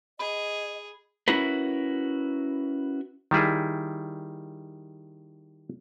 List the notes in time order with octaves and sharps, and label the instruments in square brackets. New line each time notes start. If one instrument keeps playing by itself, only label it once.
[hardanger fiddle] G#4 [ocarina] D#5 [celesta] B5
[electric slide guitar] C#4 E4 F#4 A#4 B4
[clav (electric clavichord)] D#3 G3 E4 G#4